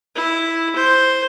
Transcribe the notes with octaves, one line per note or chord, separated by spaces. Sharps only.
E4
C5